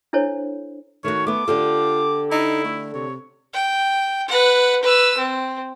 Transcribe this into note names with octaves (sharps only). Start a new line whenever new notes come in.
D4 E4 A4 C5 C#5
D#3 A3 F#4 C#5
A3 B3 D6
D3 F4 G4 A4
D#4 E4
A3
C3 C#5
G5
B4 F#5
B4 E6
C4